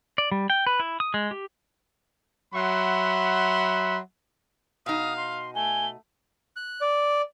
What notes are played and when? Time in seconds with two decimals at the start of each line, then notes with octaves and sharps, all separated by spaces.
0.18 D5
0.32 G3
0.50 G5
0.67 B4
0.80 E4
1.00 D#6
1.14 G#3
1.31 G4
2.54 F#3 E5 F#5 B5 C6
4.86 B2 D#4 F5 D#6
5.17 C6
5.56 A3 G#5 G7
6.56 F#6
6.81 D5